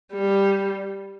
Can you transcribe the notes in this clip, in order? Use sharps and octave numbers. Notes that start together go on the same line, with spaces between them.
G3